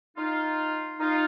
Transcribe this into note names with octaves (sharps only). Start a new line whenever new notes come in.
D#4 F4
D#4 F4